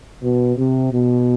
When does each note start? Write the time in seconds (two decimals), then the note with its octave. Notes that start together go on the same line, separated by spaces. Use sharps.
0.22 B2
0.56 C3
0.92 B2